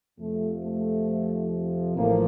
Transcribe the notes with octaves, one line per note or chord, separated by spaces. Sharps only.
F2 C3 F3 A3
A3
A1 A2 F3 A#3